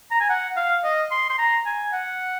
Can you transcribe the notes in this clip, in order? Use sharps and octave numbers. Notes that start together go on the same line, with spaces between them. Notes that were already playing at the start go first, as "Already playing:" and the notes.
A#5
G#5
F#5
F5
D#5
C6
C6
A#5
G#5
F#5